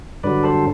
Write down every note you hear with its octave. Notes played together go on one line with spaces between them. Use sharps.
G2 D3 F#3 B4 D5
A4 C5